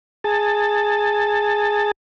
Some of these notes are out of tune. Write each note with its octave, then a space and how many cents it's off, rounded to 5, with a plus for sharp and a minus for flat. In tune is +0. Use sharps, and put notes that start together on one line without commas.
G#4 +0 A5 +15